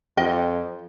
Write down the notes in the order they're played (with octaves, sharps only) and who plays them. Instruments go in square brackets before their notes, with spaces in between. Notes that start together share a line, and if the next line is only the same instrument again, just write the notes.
[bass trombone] F2 [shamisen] D#5 G5